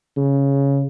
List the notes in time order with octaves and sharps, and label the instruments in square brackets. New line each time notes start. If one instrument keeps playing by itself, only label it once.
[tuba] C#3